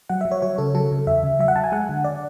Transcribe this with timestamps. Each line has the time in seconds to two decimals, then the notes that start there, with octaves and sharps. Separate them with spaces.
0.10 F#3 F#5
0.21 F#3 E5
0.31 C#5
0.42 F#3 C#5
0.58 C#3 A4
0.75 F#3 A4
0.92 C#3
1.07 E2 E5
1.23 C#3
1.39 F#3 E5
1.48 F#5
1.56 F#3 A5
1.64 G#5
1.72 G#3 F#5
1.89 D3
2.04 D5